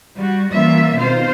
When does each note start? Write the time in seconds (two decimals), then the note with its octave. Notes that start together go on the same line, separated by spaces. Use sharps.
0.15 G3 F#4
0.51 E3 G3 A#3 C#4 F4 E5
0.96 B2 D#3 C4 F4 C5 F5